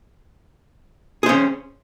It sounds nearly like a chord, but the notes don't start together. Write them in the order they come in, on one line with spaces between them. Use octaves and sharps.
G#4 C5 C#4